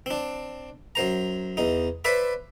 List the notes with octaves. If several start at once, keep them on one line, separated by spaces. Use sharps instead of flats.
C4 D4
F#2 C5 A#5
E2 D#4
B4 C5 D5 E5 B5